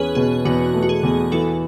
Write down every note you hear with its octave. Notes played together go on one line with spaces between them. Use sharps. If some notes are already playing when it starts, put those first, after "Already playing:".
Already playing: E2 C#4 G#4 B4
B2 G#4
E2 F#4
A3
F#4
G#4
E2
E3 F#4 A4